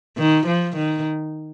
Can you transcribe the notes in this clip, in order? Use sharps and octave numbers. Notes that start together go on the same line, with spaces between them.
D#3
F3
D#3